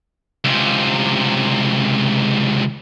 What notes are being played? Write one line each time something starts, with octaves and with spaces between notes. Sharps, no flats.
C#2 C3